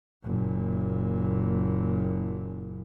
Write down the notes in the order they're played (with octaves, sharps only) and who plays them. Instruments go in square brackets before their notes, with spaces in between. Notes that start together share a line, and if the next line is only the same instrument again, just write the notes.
[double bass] F#1 A#2